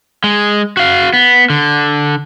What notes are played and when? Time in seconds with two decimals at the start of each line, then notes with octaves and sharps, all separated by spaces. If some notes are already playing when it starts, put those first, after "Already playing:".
0.24 G#3
0.77 F#4 F5
1.13 B3
1.50 D3